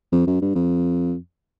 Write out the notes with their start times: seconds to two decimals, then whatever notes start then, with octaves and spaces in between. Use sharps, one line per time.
0.12 F2
0.27 F#2
0.41 G2
0.55 F2